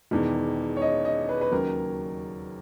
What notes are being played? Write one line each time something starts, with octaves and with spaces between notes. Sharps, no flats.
E1 E2 D#3
C#5
D#5
D#5
B4
B4
D#2 C#3 F#3 A#4